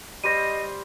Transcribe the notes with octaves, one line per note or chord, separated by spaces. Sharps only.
G3 C5 D#5 A#6 D#7